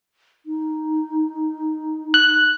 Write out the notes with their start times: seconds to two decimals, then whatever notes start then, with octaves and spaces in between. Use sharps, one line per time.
0.46 D#4
2.14 F#6